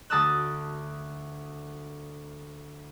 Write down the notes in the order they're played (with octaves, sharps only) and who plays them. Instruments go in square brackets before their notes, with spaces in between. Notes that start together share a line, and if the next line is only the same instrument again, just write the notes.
[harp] D2 A5 D#6 E6 F#6